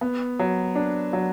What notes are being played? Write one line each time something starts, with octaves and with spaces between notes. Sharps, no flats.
B3
F#3
D4
F#3